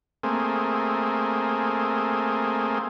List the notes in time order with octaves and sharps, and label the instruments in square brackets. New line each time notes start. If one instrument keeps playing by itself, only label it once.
[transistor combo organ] A3 A#3 C4 G#4